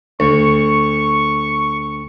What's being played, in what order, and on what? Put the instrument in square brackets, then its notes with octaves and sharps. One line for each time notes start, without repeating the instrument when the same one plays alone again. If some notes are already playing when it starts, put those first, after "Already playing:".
[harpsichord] D2 [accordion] C#6